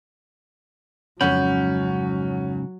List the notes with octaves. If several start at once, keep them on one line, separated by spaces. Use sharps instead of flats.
F2 G#2 C#3 F#3 C#4 F#5 B5 G6